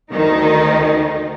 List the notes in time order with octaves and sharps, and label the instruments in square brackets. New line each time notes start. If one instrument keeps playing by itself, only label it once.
[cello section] D2 D#3 D#4